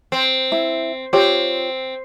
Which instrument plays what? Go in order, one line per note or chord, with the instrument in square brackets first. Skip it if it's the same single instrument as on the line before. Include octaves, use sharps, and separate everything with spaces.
[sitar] C4
[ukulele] E4
[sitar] C4 [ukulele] F4 G4 C#5